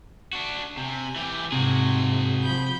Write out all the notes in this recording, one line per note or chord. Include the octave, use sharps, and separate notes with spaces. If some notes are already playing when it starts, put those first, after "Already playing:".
D4 F#4
C3 G#5
E3 G4
G#2 C3 F#4 G#4
F3 B5 G6